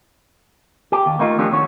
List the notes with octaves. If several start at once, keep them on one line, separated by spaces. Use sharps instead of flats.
G4
D#2
A3 A#3 D#4 F4
F3 A3 A#3 C#4 D4 G4
D#2 C#4 F#4 C#5